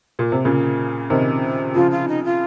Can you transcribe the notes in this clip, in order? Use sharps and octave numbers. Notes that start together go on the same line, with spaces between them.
A#2
C3
A#2 C#3
C3 D#3
C#3 F3 F4
F4
D#4
F4